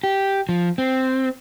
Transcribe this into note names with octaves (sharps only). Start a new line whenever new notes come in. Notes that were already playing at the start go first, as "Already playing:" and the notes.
G4
F3
C4